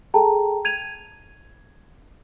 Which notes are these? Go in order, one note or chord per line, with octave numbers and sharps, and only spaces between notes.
G#4 A4 G5 A5 A#5
G#6 D#7 F7